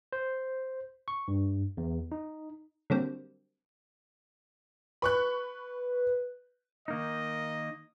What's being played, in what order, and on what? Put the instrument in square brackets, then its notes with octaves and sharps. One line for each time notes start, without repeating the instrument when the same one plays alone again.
[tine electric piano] C5
C#6
G2
E2
D#4
[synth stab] D3 F#3 G3 A#3 C4
[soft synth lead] B4 [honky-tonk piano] B5 C#6 F#6
[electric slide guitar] D#3 A#3 D#4 [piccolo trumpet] D#5